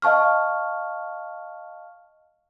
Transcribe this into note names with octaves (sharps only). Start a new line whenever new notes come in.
D#5 F5 A5 C#6 F6